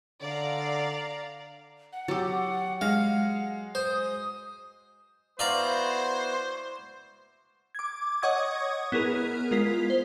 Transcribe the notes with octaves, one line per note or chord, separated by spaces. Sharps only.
D3 D5 F5 A#5
F#5
F#3 G4 D6 E6 A6
G#3 F5 F#5 A#6
C5 D#6
B3 E4 F#4 C5 D5 F5 A#5
D6 G#6
C#5 D#5 F#5 C#6 D#6 G#6
B3 E4 G#4 A#4
G#3 F4 A#4 B6
C5